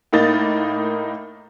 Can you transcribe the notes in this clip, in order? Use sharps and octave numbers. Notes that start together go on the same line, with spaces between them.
A2 A#3 D#4 A6